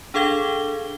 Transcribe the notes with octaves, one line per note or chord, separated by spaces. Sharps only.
D4 G#4 A4 F5 G#6 G7